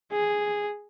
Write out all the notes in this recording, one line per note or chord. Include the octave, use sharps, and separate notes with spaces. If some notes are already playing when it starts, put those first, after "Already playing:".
G#4